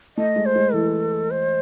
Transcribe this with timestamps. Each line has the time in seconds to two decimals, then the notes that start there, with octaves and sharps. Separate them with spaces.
0.17 A3 D#5
0.36 G#3
0.46 C5
0.56 G#3
0.73 E3 A4
1.31 C5